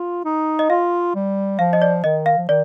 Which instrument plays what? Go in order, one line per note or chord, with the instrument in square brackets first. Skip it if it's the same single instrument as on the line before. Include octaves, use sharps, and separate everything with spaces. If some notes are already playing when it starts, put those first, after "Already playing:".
Already playing: [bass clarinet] F4
D#4
[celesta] D#5
[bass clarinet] F4 [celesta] F5
[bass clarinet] G3
[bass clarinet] F3 [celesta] F5
[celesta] D#5
D5
[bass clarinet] D#3 [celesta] D#5
[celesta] F5
[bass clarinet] F3
[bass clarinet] D#3 [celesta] D5